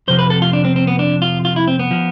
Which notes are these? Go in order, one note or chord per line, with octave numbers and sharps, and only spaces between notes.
F2 C3 F3 C5
B4
A4
F4
D4
C4
C4
B3
D4
F4
F4
E4
C4
B3
F3